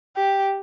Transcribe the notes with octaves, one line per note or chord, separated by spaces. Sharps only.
G4